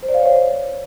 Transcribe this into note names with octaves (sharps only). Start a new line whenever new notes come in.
C5
D5
F5
C#5
C5